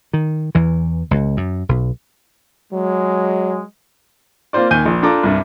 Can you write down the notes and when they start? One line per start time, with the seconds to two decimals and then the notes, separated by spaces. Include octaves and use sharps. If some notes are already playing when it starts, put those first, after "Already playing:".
0.13 D#3
0.55 E2 E3
1.11 C#2
1.37 F#2
1.69 B1
2.73 F#3 G#3
4.53 A#3 C4 F4 C5 D5
4.71 D#2 G#5 G6 D#7
4.86 A#1
5.03 D4 F4 A4 A#5 D6
5.24 C2 G2